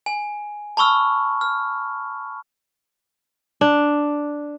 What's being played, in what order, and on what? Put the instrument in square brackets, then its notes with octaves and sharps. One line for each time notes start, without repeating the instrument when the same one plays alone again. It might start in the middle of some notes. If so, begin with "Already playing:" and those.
[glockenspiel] G#5
A5 B5 C#6 E6 F6
F6
[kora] D4